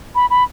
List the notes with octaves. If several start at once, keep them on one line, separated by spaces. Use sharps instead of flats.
B5
B5